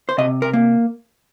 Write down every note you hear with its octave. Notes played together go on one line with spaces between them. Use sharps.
C5
C3 D#5
A#4
A#3